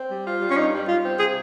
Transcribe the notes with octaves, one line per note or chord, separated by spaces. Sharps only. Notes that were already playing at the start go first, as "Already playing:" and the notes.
Already playing: C4
G3
F4
G3
C#4
G2 D#4
G3
G3 F4
C4
C3 G#4